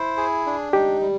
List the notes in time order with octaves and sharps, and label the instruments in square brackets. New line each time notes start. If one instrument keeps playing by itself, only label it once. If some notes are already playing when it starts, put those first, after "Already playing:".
Already playing: [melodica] E4 C5
G#4
D4
[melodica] D#4 [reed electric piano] G4
[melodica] G3